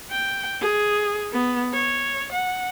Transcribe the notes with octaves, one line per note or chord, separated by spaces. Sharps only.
G5
G#4
B3
C#5
F#5